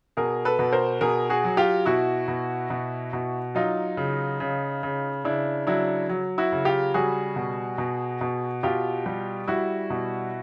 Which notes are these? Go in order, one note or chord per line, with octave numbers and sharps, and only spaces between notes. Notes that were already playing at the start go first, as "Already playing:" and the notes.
B2 G#4 A#4
A4 B4
B2
A#4 C5
B2 G#4 A#4
F#4 G#4
F#3
F4 G4
B2 E4 F#4
B2
B2
B2
F#3 D#4 F4
C#3
C#3
C#3
C#3 D4 E4
F#3 D4 E4
F#3
E4 F#4
C#3
F4 G4
G3 F#4 G#4
B2
B2
B2
B2 F4 G4
G3
G3 E4 F#4
B2